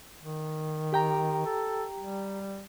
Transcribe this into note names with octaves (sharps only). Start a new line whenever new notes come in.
D#3
G4 G5 A#5
A4
G3